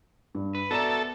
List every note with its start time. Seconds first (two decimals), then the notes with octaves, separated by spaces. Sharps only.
0.35 G2
0.55 B4
0.71 B3 F#4 A4 D5 E5 A#5